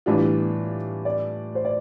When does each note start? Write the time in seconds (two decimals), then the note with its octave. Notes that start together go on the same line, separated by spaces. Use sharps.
0.06 A2 E3 G3 D4 F4
1.05 D5
1.55 C5
1.65 D5